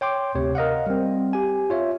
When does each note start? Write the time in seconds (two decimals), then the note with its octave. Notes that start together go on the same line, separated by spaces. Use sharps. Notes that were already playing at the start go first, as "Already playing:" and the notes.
0.01 C#5 G5 C6 D6
0.35 D2 C3 C#5
0.55 A#4 D#5 F5 F#5
0.86 G3 C4
1.33 G4 G#5
1.70 F4 C#5 E5